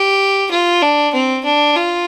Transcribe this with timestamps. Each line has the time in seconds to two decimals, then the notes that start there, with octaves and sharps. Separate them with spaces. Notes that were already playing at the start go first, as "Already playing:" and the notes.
Already playing: G4
0.50 F4
0.82 D4
1.13 C4
1.44 D4
1.76 F4